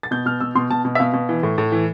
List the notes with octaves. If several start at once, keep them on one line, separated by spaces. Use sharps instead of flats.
A6
B2 G6
B2 F6
B2 E6
B2 C6
B2 A5
B2
E5
B2 F5
B2
E3
A2
A2
E3